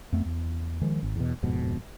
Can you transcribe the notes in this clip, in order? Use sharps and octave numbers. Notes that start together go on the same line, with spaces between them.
F2 A3 B3
E2
D#3 F3 G#3
G#1
E2 B2
D1 F2 G#2 B2